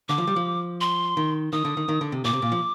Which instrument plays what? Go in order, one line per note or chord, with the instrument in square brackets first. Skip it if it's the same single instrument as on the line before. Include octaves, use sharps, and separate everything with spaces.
[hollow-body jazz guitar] D3 [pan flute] D6
[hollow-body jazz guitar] F3
G3
F3
[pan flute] C6
[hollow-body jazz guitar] D#3
[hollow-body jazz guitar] D#3 [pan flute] D#6
[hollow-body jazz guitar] D3
D#3
D#3
D3
C3
[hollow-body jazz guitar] A#2 [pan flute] D6
[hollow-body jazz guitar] C3
A#2
F3